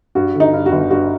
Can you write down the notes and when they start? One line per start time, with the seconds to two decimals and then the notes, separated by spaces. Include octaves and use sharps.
0.15 G2 F#4
0.35 D3
0.40 D#4
0.53 G2
0.66 F#4
0.72 G1
0.91 G2 F#4